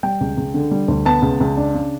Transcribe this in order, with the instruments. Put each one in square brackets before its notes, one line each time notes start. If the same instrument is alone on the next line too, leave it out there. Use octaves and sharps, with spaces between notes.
[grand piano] G3 G5
C#2
C#2
D3
G3
D2
B3 A5
C#2
C#2
D4
C#3